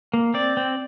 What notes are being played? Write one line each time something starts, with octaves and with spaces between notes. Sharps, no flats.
A#3
C4 D5
C4